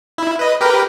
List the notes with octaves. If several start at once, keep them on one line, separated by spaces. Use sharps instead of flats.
E4
B4 D#5
G4 A#4 B4